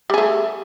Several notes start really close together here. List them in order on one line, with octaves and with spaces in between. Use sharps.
G3 G#4 A3